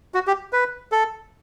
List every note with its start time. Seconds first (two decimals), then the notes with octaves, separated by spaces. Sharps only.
0.14 F#4
0.27 G4
0.53 B4
0.92 A4